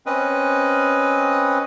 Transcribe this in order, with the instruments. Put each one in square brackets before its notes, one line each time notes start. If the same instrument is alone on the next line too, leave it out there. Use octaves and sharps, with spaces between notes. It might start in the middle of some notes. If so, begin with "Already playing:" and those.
[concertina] C4 C#4 B4 D#5